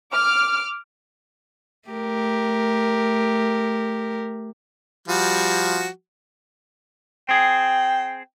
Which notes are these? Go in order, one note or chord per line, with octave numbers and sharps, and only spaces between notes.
D6 F6
A3 G4 A#4
F3 G3 F#4
C4 G#4 G5